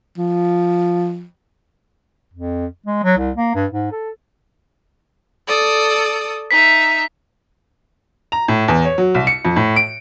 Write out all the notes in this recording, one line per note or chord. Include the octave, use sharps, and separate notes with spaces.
F3
F2
G#3
F#3
C2
A#3
G2
G#2
A4
A4 D5 D#6
D#4 E5 B6
A#5
A2
E2
C#5
F#3
C2
C#7
F2
A2
D7